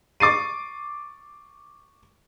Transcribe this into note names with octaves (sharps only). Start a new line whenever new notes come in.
C#6 D6 A6 C7 D#7